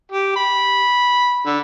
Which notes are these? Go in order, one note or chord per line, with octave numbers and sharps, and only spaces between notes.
G4
B5
D3